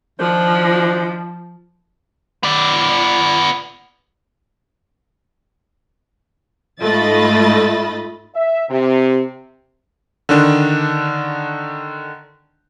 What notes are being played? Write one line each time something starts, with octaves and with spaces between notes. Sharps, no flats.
D#3 F3 D4 C5
B3 D5
G#2 A3 F4 D#5 B5 A6
E5
C3
D3 D#3 D4